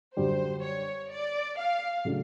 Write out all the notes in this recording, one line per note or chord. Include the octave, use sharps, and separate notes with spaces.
F#2 D3 G3 C5
C#5
D5
F5
C#3 F#3 A3 D4